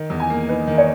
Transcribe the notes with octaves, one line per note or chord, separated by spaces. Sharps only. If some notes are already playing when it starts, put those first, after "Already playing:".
Already playing: D#3
E2
G#5
A#3
D#4 B4
D#3
C#5